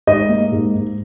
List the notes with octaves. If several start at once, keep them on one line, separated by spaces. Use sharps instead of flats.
G#2 D#5
A#3
G#2
G#2